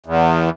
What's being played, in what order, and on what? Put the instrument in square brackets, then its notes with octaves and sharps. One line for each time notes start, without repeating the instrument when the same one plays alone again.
[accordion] E2